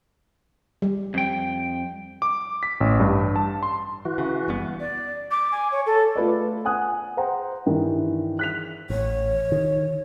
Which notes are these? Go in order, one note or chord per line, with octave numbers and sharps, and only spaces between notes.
G3
F2 G5
D6
B6
A1
G2
A5
C6
E3 F#4
C#3
F#1 G3 B3
D5
D6
G#5
C#5
A4
A3 F4 B4 D5
F#5 G#5 D#6 F#6
C5 F#5 G5 A#5 C6
G2 D#3 E3
F#6 B6 F7
A1 C#5
D#3